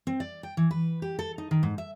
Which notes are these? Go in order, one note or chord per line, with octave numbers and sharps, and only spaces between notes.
C4
D5
G5
E3
B4
G4
A4
D#4
D#3
G#2
E5